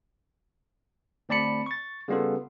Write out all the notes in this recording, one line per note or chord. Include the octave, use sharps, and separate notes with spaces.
D2 C4 D5 A5 B5 C#7
C#6 A6
C#3 G3 B3 F4 A4